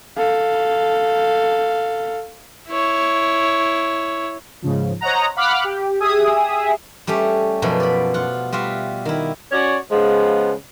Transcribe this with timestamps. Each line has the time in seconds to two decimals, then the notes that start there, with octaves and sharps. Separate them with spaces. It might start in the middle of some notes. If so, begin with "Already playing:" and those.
0.17 A4 F5
2.69 E4 C#5
4.62 G#2 C#3 F3
5.01 C5 C#5 D#5 F#5 A#5
5.36 F5 F#5 B5 D6 F6 F#6
5.64 G4
6.00 G4 G#4 E5 G#5 D#6
7.07 G3 A3 C#4 G4
7.62 F#2 B2 F3
7.80 D5 B5
8.14 F4 F#5
8.53 G3 F4 F#4 E5
9.05 D#3 E4
9.52 C#4 F#4 C#5 D5
9.91 C#3 F3 G#3 B3